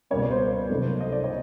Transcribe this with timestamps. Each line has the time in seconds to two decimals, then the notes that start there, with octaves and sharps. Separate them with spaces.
0.10 C#2 B2 G3 A#3 C#4 C#5
0.20 D5
0.31 C5
0.70 C#2 C3 D#3 F#3 A3
1.01 D#5
1.12 D5
1.24 C#5